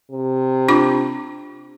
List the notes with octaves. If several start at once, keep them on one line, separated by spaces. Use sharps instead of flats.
C3
D4 F4 D6